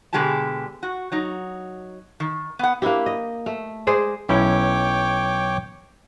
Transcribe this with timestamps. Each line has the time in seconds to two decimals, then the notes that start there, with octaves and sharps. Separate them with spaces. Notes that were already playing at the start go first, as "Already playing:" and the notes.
0.13 B2 D3 G#3 G4 G#4 A5
0.83 F#4
1.12 F#3 D#4
2.20 D#3
2.59 B3 F#5
2.82 A#3 D4 E4 G4
3.06 D#5
3.46 A3
3.87 G#3 G#4 C5 D5
4.29 B1 C#4 E4 C#5 G5 D6